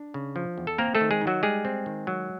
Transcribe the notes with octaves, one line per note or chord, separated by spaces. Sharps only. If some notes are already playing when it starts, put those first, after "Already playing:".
Already playing: D4
C#3
F3
E2
A4
A#3 C4 A#4
A3 A4
D#3
G#3 G#4
D#4
F#3 F#4
G3 G#3 G#4
C4
D#3
F#3